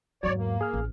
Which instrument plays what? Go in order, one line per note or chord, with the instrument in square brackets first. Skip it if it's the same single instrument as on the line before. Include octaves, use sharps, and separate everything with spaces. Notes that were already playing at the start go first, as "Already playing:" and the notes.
[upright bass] E2 G#2 [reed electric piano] F#3 [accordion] C#5 D5
[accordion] A#3
[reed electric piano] G#4 F6
[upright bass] A1